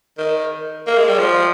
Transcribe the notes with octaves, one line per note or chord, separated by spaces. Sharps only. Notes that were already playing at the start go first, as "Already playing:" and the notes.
D#3
A#3
G#3
G3
F3